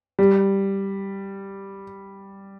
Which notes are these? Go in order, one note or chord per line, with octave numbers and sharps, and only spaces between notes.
G3